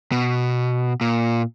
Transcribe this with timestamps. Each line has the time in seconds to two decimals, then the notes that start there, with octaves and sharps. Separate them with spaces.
0.12 B2
1.01 A#2